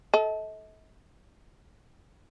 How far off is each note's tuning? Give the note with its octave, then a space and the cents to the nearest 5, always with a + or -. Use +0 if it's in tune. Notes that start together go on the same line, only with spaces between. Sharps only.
A4 -15 D#5 +45